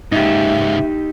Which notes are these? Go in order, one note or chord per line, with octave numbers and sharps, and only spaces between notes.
C#2 G#2 D#4 G4 E5